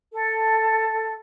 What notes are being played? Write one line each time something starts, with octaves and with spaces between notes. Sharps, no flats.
A4